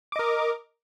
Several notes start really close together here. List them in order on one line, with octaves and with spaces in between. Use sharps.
D6 D#5 A#4